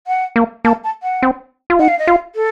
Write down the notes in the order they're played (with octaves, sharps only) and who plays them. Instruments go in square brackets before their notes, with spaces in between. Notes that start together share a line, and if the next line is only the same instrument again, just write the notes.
[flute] F#5
[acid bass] A#3
[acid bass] A#3 [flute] A5
[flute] A5
F#5
[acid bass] C4
F4
[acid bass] D#4 [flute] F#5
[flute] F5
D#5
[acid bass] F4 [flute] F5
[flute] A4